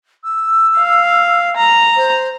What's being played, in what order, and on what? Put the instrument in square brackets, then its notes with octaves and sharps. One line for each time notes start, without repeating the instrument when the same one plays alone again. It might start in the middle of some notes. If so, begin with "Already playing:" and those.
[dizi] E6
[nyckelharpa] F5
A#5
[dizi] C5